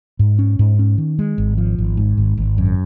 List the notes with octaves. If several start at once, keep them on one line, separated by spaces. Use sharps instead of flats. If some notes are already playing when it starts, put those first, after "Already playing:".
G#2
C#4
G#2
C#4
D#3
G#3
G#1
F3
G#1
G#2
G#1
G#1
F#2